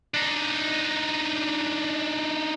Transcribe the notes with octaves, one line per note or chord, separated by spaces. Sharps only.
D4 D#4